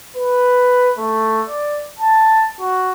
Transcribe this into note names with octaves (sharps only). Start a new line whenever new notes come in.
B4
A3
D5
A5
F#4